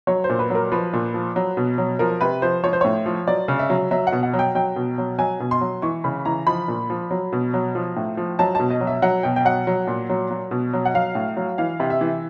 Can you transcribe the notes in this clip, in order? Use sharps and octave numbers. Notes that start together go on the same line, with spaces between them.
F#3 C#5
C5
A#2
B4
F#3
A#4
F3 B4
A#2
F3
F#3
B2
F#3
F3 A#4
C3 B4
F3 C5
F3 C#5
C5
A2 C#5
F3
F#3 D5
C#3
E5
F#3
F#3 E5
F#5
B2
F#5
F#3
G5
F#3 G5
B2
F#3
F#3 G#5
B2
C6
F#3
E3 C#6
C#3 B5
E3 A#5
F3 B5
A#2
F3
F#3
B2
F#3
F3
A2
F3
F#3 A5
B2 A5
D#5
F#3
E5
F#3 F#5
B2 G5
G5
F#3 F#5
F#3
A#2
F#3
F#3
B2
F#3
F#5
F#3 F5
A2
F#3
E3 F5
C3
E5
E3